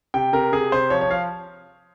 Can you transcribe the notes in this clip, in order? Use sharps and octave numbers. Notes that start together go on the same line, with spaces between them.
C3 G5
C3 A#4
C3 G#4
C3 C5
F3 C#5
C#5
F3 F5